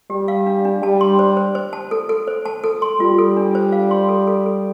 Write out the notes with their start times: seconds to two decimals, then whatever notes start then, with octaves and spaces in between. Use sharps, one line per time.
0.10 G3 G4
0.28 F5
0.46 D4
0.65 D4
0.82 G3 A5
1.01 C6
1.19 C5
1.37 C5
1.55 C5
1.73 A5
1.91 A4
2.09 A4
2.27 C5
2.46 A5
2.64 A4
2.82 C6
3.00 G3 F4
3.18 A4
3.37 D4
3.55 C5
3.72 F5
3.91 C6
4.09 A4
4.27 A4
4.46 A4